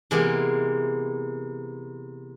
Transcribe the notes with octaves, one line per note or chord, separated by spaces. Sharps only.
C3 E3 G#3 A#3 B3